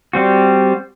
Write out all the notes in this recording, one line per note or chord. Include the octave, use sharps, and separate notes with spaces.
G3 C4 F#4